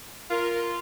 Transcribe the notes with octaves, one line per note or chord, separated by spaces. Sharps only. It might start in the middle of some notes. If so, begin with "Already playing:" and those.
F4 A#4